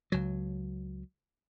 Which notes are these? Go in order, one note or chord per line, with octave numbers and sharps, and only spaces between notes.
C#2 F#3